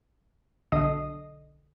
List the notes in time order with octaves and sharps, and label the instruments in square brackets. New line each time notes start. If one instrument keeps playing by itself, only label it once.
[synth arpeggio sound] B1 D3 D#5 D#6 C7